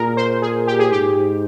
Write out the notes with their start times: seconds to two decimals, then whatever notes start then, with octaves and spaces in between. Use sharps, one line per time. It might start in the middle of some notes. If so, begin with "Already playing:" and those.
Already playing: A#2 G#4 A#4
0.17 C5
0.42 G#4
0.67 G4
0.79 G#4
0.92 G#2 G4